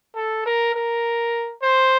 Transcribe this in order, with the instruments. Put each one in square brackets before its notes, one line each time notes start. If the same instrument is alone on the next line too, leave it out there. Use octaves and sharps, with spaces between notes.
[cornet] A4
A#4
A#4
C5